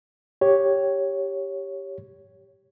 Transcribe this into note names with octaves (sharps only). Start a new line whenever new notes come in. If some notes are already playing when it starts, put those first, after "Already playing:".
G4 C#5